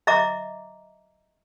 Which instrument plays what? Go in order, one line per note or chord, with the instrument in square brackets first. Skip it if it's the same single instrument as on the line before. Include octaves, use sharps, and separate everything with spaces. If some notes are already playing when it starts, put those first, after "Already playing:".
[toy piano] D#5 E5 A#5 D6